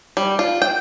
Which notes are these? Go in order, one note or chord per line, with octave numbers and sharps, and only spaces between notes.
G3
F4
G5